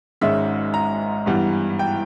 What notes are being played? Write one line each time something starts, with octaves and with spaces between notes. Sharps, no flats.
G#1 G#2 D#3 G#3 C#4 E5
A#5
G2 E3 G3 B3
G5